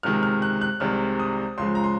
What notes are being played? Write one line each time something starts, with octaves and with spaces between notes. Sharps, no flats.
C#2 C3 D#3 G#3 F6
F6
F#6
F#6
C2 C3 D#3 G#3 F6
D#6
C#2 C#3 F3 G#3 C6
A#5
C6